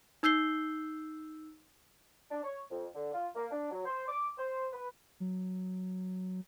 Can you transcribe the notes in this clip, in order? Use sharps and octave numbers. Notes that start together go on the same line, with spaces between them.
D#4 E6 G6 C7 G7
D4
C#5
F2
D3
F4
A#3
D4
F#3
C5
D6
C5
B4
F#3